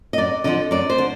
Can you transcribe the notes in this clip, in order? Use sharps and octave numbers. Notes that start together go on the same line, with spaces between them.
D#5
F#2 D5
D3 F3 D#5
F#2 D5
C5
D3